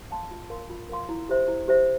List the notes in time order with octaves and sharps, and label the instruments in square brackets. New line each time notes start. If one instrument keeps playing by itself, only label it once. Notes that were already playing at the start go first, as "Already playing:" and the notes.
[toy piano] F5 A5 C6
F4
A#4 F5 C6
F4
A#4 F5 C6
E4
G4 C5 E5
E4
G4 C5 E5